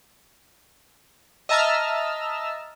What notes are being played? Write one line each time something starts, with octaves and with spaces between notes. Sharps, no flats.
D#5 E5 A5 A#5 E6 F6